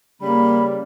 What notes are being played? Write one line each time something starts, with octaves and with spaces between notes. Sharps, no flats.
C#3 G3 A#3 B5